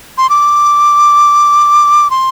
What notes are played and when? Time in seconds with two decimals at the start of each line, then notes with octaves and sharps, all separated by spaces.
0.18 C6
0.30 D6
2.10 C6